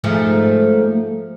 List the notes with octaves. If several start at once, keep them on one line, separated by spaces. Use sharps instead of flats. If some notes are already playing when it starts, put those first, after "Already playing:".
G#2 F3 A3